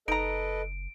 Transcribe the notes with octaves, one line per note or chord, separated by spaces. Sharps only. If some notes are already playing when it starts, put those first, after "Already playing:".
F#1 D#4 A4 B4 D#5 A#5 D7